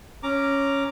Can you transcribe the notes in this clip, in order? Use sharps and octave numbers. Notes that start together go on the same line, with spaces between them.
C#4 A#5 D6